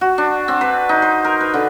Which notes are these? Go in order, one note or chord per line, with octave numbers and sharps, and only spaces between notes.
F#4
D4
C4
B4
D#4
C5
A#4
B4
D3